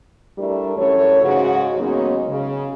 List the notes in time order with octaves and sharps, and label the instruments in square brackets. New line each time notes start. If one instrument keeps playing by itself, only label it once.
[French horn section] G3 A3 D4 E4 A#4
F#2 E3 A3 C#5
G#2 C#3 F#4
F#3 G#3 A#3 B3 C#4 D#4
C#3